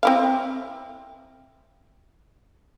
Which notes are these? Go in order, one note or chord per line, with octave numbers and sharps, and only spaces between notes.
C4 E4 F5